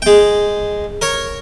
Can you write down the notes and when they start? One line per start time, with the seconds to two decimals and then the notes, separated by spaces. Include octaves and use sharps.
0.02 G#3 G5
1.02 A#4 C#5